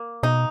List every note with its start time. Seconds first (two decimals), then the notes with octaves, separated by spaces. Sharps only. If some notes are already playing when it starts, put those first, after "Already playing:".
Already playing: A#3
0.23 B2 D#4